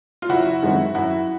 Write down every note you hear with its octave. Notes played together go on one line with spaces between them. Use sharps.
F4
F#1 E4 F#4
F#2 D#3 G#3 C4
F#2 E4 F#4